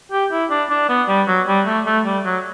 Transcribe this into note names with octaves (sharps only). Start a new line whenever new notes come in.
G4
E4
D4
D4
B3
G3
F#3
G3
A3
A3
G3
F#3